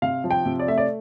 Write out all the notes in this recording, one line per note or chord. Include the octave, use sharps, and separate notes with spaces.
C3 F5
F3
G5
C3
D5
A3 E5
D5